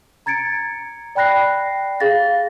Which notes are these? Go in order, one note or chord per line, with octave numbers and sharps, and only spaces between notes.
A#5 G#6 A6 C#7 D7
D5 G5 B5 F#6 A#6 C7
G#4 F5 A6 A#6